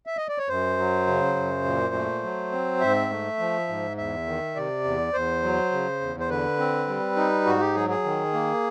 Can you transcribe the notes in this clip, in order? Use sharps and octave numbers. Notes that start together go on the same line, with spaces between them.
E5
D#5
D5
C#5
F#2 C5
F#3
C#3
F#2
A#2
A3
F#3
C4
G#2 E5
A3
F3
G#2
E2 E5
D#3
C3 D5
E2
E2 C5
F#3
C#3
E2
C5
D3 B4
C4
G3
D#4
G#2 F#4
G4
F#3 G#4
G#4
D#3
A#3